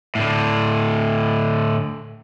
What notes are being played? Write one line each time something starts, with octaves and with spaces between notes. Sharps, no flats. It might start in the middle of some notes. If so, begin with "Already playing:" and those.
A2 D3